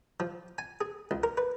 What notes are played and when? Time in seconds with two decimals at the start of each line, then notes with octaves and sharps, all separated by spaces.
0.20 F3
0.58 G#5
0.81 G#4
1.11 C#2
1.23 A#4
1.37 B4